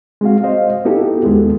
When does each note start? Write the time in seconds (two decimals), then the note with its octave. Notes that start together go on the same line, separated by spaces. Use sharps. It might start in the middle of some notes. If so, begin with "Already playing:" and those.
0.21 G#3 C4 F#4 F5
0.44 C5 D#5 F5
0.85 B3 D#4 E4 F#4 G4 A4
1.24 D#2 G#3 B3